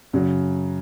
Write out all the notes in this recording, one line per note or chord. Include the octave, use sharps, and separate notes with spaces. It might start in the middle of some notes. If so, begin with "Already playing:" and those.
F#2 C#3 F#3